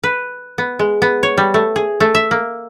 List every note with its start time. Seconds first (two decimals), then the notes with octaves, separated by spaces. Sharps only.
0.03 B4
0.58 B3
0.79 G#3
1.02 B3
1.23 C#5
1.37 G3
1.54 A3
1.76 G#4
2.00 A3
2.15 E5
2.31 A#3